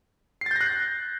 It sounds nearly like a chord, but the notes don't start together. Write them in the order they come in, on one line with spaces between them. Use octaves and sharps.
C7 A6 G6 A#6 F#6